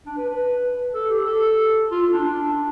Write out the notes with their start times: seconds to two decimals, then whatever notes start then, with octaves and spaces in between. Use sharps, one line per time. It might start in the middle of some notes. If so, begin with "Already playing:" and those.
0.06 D4
0.17 B4
0.28 B4
0.94 A4
1.10 G4
1.25 A4
1.91 F4
2.02 F4
2.13 D4
2.24 D4